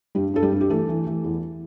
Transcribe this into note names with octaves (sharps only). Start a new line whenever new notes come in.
G2 G3 G4
G2 A4
G3 G4
G2
G4
E3 A3 A4
E3
E3
E2